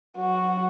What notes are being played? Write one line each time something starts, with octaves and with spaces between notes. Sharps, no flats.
F#3 F#4